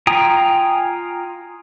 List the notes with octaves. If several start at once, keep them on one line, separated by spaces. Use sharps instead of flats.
F4 G5 G#5 A#5 D#6